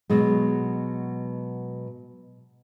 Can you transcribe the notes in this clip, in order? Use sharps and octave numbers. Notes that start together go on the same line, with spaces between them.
B2 F#3 G#3